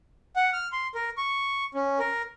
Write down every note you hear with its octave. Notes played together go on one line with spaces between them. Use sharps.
F#5
F6
C6
A#4
C#6
C#4
A#4